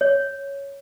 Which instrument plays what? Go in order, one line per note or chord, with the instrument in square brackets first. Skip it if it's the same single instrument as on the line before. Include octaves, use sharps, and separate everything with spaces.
[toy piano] C#5